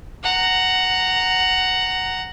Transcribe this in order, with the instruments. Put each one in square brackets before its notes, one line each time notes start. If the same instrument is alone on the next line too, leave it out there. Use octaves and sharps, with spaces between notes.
[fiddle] F#5 A#5